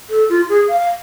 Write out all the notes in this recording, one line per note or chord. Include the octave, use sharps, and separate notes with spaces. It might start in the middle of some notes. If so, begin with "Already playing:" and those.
A4
F4
G#4
F5